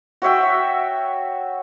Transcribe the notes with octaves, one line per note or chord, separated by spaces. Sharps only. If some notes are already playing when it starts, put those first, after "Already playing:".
F#4 C#5 E5 G5